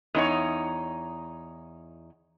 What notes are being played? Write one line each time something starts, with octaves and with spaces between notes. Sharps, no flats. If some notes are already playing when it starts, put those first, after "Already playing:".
E2 D#4 C#5